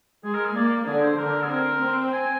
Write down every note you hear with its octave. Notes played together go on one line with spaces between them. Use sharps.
G#3 G#4
A#4
G#4
A#3 D5
D3 D4 G#4
C5
D3 D4 A#4
G#4
C4 A#4
C4
G#5